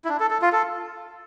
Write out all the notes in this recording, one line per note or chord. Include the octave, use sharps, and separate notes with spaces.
E4
D4
A4
A4
F4
A4